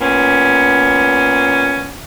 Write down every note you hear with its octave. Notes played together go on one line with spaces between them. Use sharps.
A#2 B3 C#4